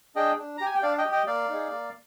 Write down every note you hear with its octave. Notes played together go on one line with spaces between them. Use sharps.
D4 G#4 D#5 G5
D4
G4 A#5
G#5
G5
D4 D5 F5
D#5 G5
G4
D#5 G5
A#3 D5 F5
D#4 G#4
A#3